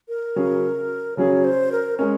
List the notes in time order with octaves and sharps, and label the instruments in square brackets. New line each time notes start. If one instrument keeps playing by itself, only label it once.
[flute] A#4
[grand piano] C#3 F#3 C#4 G#4
[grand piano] C#3 F#3 C#4 G#4 [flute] C#5
[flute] C5
A#4
[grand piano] G#3 C#4 [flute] A#4